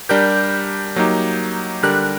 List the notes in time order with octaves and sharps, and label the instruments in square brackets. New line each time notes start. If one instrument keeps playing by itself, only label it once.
[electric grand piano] G3 D4 G4 A#4 [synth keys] G6
[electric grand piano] F#3 A#3 D#4 G4
[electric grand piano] D3 G3 D4 G4 A#4 [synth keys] F#6